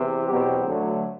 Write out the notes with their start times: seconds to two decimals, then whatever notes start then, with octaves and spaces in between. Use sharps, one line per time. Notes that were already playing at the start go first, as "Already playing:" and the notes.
Already playing: E2 C3 E3
0.28 E2 B2 F#3 C4 G4
0.67 D2 D3 F#3 A3